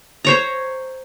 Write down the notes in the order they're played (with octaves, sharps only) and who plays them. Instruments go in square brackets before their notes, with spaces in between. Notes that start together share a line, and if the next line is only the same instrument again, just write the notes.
[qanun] C5 C#5 A#5